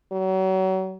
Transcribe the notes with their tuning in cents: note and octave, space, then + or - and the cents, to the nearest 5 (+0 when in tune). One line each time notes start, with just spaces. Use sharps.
F#3 +35